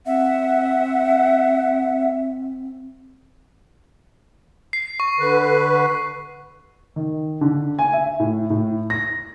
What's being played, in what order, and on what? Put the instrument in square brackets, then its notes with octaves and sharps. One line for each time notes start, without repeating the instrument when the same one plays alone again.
[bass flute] C4 [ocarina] E5 [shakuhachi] F#5
[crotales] C7
C#6
[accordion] D3 B4
[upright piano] D#3
D3
G#5
E5
A2
A2
A#6